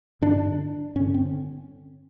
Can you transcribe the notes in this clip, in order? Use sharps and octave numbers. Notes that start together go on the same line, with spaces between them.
G2 D3 D4
G2 D3 C#4
C4